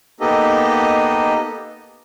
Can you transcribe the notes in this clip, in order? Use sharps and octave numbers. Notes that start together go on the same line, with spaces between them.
A#3 B3 D#4 G4 A4 D#5